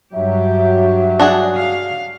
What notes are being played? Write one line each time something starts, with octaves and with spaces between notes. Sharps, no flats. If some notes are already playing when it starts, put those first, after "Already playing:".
G2 F#3 G4 E5
D4 F#4 G#4
F5